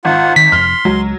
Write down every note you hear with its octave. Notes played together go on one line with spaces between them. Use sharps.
G#1 F4 F#5
D#3 B6
F1 F2 C6 F6
C#2 F#3 G#3